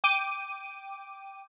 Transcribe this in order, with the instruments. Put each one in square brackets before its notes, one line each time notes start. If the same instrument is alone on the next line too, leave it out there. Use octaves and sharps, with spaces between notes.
[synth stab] G5 D6 D#7